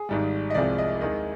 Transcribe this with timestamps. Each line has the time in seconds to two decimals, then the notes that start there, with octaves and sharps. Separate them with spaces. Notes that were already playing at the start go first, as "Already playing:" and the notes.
Already playing: G#4
0.09 G#1 G#2 G3
0.50 D#5
0.54 C2 C3 F3 G#3 D5
0.78 D#5
1.01 D#2 D#3 G#3 D#5